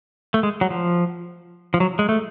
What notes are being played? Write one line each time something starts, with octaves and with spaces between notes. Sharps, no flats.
A3
G#3
F#3
F3
F3
F#3
G#3
A3